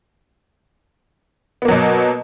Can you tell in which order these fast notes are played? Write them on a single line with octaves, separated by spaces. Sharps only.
B3 A#3 F#3 B2